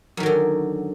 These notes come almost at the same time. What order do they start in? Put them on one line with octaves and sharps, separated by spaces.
F#2 D#3 F#3 D3